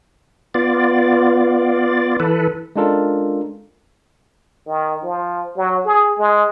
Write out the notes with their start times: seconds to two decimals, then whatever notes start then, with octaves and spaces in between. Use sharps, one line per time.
0.54 B3 F4 D5
2.20 E3 A4 B4
2.76 G#3 C#4 D4 F4 A4 A#4
4.67 D#3
5.03 F3
5.56 F#3
5.85 G#4
6.18 G#3